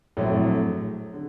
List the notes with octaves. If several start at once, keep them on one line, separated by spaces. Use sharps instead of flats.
A#1 A2 F#3 A3 C4
D3